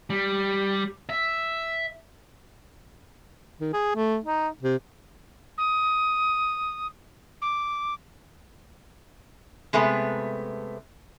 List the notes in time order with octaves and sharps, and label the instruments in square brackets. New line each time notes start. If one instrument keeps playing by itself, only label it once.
[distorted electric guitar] G3
E5
[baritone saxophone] D#3
G#4
A3
D#4
C3
[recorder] D#6
D6
[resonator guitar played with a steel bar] C3 G#3 A3 B3